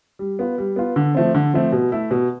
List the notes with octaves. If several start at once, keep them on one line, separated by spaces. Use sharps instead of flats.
G3
B3 F4
G3
B3 F4
D3
F3 A3 C4
D3
F3 A3 C4
B2
A3 E4
B2